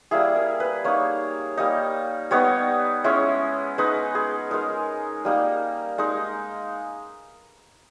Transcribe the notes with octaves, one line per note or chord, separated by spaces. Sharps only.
G3 A#3 E4 G#4
A#4
B4
A#3 D#4 C#5
G3 A#3 D#4
G3 B3 D#4 C#5
G#3 C#4 E4
G#3 D#4 B4
G#4
G#3 D#4 A#4
G3 A#3 D#4
G#3 D#4